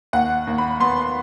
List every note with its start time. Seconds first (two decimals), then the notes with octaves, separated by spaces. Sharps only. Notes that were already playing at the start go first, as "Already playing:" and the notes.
0.13 D#2 F#5
0.47 D#2
0.58 B5
0.80 B3 C6